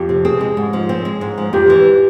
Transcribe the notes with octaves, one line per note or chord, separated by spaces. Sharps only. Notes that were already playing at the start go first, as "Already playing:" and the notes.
Already playing: F2 G4
C3
C4 G#4
G#3
G#2
F3
C4
G#3
G#2
F3
F2 G4
E3